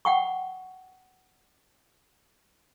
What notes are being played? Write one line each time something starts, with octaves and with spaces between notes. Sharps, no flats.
F#5 G5 C#6